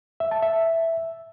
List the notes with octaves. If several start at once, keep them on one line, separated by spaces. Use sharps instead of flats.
E5
A5
E5